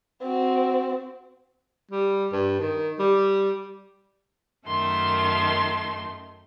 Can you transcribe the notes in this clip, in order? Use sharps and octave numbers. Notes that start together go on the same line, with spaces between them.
C4 F#4
G3
G2
D#3
G3
F#2 D#3 A3 C6